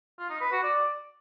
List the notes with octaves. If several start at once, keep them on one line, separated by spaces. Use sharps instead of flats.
F4
D#4
B4
F#4
D5